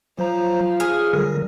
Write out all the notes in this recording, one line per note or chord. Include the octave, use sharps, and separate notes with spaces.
F3 F#3 C5 A#5
G#4 C#5 F6
D3 F#3 G3 A#4